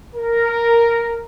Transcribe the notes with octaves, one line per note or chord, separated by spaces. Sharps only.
A#4